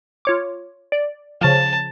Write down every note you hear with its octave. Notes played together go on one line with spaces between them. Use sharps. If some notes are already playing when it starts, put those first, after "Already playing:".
F4 C#5 D6
D5
C#3 F3 A5